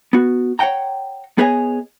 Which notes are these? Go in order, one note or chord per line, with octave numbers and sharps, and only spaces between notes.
B3 F#4
C#5 D5 F#5 G5 A#5
B3 G#4 B4 C#5 D#5 G#5